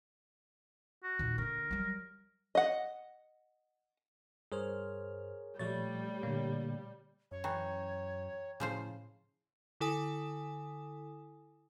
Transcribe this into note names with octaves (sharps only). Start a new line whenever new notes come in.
F#4
D#2 A#2
D3 A#3 A#4
F#3 G3
D#5 F#5
G2 G#4 A#4 C5 C#5 F6
A#2 F3 G3 A3 C#5 A6
A#2 D3 A#3
F#2 C#5
E3 G5 A#5 C#6
A2 C#3 F3 C5
D3 E4 A4 G#5 D#6